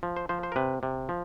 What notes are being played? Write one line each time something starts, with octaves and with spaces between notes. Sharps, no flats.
F3
C5
F3 C5
C5
A#4
C3 B4
C3
F3